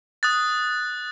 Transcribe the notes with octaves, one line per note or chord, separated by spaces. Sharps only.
D#6 F#6 A6